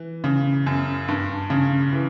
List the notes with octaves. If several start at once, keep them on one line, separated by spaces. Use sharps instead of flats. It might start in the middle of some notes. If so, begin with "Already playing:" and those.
Already playing: E3
C#3
F#2
G2
C#3
E3